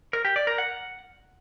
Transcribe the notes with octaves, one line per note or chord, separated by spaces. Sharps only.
A#4
G4
D5
A#4
F#5